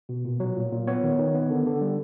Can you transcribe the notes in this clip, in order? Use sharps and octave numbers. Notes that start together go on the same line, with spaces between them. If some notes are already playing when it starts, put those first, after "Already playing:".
B2
A#2
F#3
A#2
A#2
B3 C#5
D#3
D#3
B3
D3
D3
G3